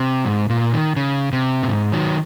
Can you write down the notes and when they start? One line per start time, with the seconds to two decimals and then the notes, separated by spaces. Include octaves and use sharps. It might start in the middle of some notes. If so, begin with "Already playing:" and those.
Already playing: C3
0.25 G#2
0.50 A#2
0.73 D#3
0.96 C#3
1.33 C3
1.63 A#2
1.68 G#2
1.92 D#3 F#3